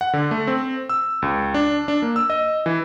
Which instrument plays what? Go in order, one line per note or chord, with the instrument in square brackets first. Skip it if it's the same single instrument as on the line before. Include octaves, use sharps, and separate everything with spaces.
[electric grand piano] F#5
D3
A3
C4
E6
C#2
D4
D4
A#3
E6
D#5
E3